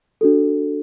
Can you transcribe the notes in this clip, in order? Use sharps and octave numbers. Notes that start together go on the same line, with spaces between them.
D4 F#4 A4